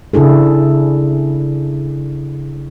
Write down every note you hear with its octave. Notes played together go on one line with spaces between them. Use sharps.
C#3 D4 E4 G#4 A4